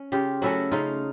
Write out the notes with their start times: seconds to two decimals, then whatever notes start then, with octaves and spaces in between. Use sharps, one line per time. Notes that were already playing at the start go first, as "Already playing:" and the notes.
Already playing: C#4
0.12 C#3 F4 G4
0.42 F#3 A3 C#4 E4 F#4
0.72 C#3 D#4 F4